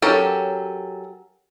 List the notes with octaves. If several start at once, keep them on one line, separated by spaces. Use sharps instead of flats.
F#3 C#4 G4 A4 A#4